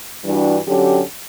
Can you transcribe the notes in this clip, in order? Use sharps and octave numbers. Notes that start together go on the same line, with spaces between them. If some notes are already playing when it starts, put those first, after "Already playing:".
G2 E3 G3 D4 F#4
D3 F#3 C#4 G4